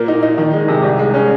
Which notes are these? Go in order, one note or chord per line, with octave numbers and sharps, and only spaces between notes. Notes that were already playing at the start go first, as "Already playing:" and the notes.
Already playing: A#2 A#3
D#4
D#4
D#3
G#3
C3
C2
G#3
C#4